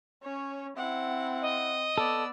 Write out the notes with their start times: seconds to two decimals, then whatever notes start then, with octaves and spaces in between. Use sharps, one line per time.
0.24 C#4 C#5
0.77 C4 E4 F#5
1.42 D#5
1.98 B3 A4 D5 E6